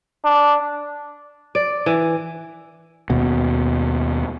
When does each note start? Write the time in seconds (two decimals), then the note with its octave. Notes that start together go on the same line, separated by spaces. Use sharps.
0.24 D4
1.55 D5
1.86 E3
3.10 D#2 B2